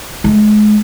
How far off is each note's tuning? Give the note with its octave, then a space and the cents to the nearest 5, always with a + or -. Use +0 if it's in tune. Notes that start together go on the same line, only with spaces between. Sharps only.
G#3 +30